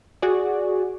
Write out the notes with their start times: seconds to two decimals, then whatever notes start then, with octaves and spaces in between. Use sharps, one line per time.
0.22 F#4 G#4 D5